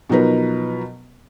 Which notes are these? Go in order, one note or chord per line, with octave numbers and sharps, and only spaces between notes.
B2 F3 F#3 D#4 A#4 B4